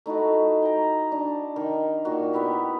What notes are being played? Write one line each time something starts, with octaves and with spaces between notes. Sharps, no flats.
A3 D#4 E4 F#4
G5 A#5
D4
D#3
A#2 D#3 F#4
B3 E4 G4